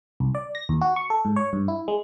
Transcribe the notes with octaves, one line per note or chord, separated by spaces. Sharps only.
C2
D5
A#6
D#2
F#4
C#6
A4
G#2
C#5
G2
E4
G#3